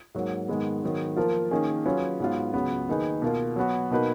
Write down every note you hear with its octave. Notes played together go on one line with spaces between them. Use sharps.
G#2 F#3 A#3
G#2 D#3 G#3 B3
G#2 D#3 F#3 B3
F3 A#3 F4 A#4
D#3 A#3 C#4 G#4
F#3 C#4 F4 G#4 B4
G#2 F#3 B3 F4
C#2 C#3 F#3 B3 F#4
D#3 A#3 D#4 G#4 B4
B2 A#3 F4
F#3 B3 F#4
B2 A#3 D#4 F#4 B4